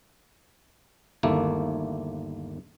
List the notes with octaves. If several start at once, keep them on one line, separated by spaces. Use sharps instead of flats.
G1 D#2 A3 A#3 E4